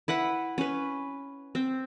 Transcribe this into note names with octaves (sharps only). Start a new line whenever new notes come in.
E4 B4 F#5 B5
C#4 B4
C4